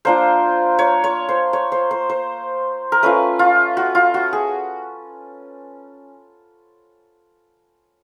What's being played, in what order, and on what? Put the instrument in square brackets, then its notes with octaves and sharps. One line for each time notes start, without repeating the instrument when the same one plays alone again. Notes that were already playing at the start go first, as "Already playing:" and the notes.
[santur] A#3 D4 F4 C5
C#5
C#5
C5
C#5
C5
C5
C5
A#4
A3 C#4 F4 B4
F4
F#4
F4
F#4
G#4